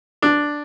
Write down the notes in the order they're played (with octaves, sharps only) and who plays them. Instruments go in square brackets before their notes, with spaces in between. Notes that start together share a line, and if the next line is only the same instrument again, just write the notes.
[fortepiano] D4